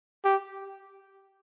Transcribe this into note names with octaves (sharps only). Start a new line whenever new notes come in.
G4